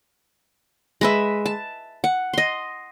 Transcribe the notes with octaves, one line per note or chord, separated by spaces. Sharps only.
G#3 B4 E5
A5
F#5
D#5 C6